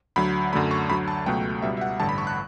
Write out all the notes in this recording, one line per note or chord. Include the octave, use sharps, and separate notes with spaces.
D2 D3 F#3 B5
F#2 D3 F#3 A3 B5
C#6
D2 D3 F#3 B5
A5
C#2 B2 F#3 A3 G5
C#2 B2 G3 B3 E5
E5
F#5
A1 G2 D3 A5
B5
C#6
F#6